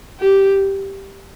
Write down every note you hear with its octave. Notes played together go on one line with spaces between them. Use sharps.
G4